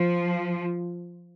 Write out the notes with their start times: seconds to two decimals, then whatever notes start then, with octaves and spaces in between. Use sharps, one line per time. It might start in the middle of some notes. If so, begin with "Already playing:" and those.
Already playing: F3